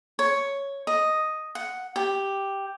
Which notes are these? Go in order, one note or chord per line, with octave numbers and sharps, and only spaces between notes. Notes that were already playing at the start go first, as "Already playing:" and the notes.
C#5
D#5
F#5
G4